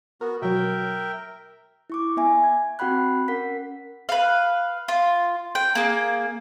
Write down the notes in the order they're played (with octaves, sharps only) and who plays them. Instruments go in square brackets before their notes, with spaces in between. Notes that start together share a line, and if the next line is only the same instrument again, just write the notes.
[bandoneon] B3 F#4 [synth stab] A#4
[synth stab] B2 F#3 [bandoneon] A#4 E5 G5
[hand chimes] E4 C#6 D6
B3 E5 G#5
G#6
C4 F#4 F#5 G5 B5 F#6
C#4 A#4 F#5 B6
[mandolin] B4 F5
F4
G5
A#3 G#4